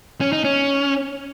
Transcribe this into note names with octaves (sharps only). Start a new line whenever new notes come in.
C#4
D#4
C#4